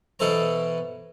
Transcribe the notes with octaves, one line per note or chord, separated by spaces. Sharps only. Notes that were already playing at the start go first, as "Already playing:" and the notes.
B2 E3 A4 C5 A#5